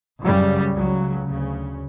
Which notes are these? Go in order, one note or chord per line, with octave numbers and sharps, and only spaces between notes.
F#2 C#3 G3
C#2 C#3 F#3
D2 C#3